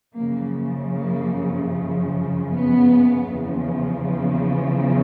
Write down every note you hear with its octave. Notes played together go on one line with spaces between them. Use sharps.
F#2 C#3 F3 A#3
A#3
B3
E2 C#3 F3